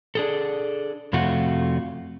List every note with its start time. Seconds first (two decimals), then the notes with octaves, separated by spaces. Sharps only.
0.15 D4 G#4 A4
1.13 F2 C3 A3 F4 F#4